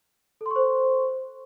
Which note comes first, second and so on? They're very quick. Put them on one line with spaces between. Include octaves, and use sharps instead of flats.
A4 C6 C#6 C5